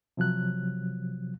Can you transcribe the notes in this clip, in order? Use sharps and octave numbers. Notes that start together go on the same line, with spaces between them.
C3 F3 F#3 F#6